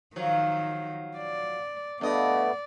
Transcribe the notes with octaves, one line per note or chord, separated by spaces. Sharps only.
D#3 F3 F#3
D5
G2 A3 B3 D5 D#5